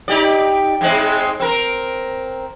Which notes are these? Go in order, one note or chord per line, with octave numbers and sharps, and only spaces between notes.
D#4 G4 D5
G#2 G#3 C4
C4 A#4